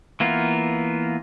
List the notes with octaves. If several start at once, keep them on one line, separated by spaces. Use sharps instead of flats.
E3 A#3 B3 F4